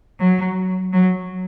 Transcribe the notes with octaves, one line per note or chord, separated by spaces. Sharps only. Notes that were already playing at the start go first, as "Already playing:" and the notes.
F#3
F#3